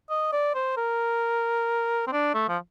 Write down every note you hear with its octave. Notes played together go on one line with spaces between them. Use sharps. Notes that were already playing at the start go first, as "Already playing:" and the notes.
D#5
D5
C5
A#4
C4
D4
A3
F3